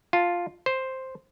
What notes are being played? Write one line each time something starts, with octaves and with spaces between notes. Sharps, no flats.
F4 A5
C5